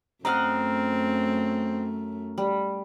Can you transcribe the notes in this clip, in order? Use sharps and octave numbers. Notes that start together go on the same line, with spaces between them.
F#2 A3 C4 D#5 F5 F#5 A#5 F6
G3